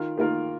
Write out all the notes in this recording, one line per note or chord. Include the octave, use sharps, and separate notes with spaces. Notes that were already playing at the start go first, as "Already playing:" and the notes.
Already playing: D#3 F4 A#4
D#3 A#3 F4 A#4